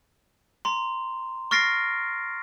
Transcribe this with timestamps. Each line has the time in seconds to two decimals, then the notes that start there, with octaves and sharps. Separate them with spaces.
0.65 A#5 C6
1.51 C#6 F6 A6 A#6 C7 D7